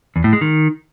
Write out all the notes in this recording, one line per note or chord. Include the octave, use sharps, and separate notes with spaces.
E2
A2
G#3
D#3